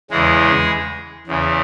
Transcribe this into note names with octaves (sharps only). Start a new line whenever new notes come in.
E2 C#3 E3 G#3 G#4
E2 C#3 E3